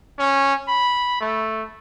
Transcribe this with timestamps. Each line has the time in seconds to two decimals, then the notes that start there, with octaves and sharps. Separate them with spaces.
0.19 C#4
0.68 B5
1.21 A3